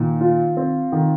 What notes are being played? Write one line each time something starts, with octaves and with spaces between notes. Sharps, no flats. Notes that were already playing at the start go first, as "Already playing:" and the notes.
Already playing: A#2 D#3
F4
C4
D#3